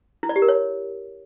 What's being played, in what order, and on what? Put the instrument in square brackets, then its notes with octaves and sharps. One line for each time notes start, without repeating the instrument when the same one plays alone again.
[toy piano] E4
D5
G4
A#4
C#5